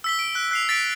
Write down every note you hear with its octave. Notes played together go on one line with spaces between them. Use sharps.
E6 B6 G7
D7
F#6
F#6 C7 F7
A6 B6 D7